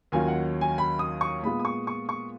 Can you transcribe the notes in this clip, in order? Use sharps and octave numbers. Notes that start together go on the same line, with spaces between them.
D#2 D#3 F#3 C#4 F4 G#5
F#5
G#5
B5
D#6
C#6
A#2 G#3 B3 F4 B5
D#6
C#6
C#6
C#6